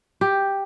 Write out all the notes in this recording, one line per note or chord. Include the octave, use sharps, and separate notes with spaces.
G4